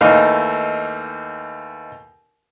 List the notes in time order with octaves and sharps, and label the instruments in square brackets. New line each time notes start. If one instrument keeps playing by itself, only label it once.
[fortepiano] D#2 E3 A3 D#4 F5